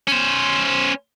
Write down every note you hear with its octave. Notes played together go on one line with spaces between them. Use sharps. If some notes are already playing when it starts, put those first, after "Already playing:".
C#4 C5